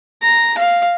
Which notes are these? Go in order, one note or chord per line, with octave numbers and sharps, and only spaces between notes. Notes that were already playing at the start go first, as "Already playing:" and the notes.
A#5
F5